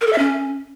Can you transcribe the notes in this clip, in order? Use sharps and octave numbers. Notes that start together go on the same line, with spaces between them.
A#4
A4
E5
C#4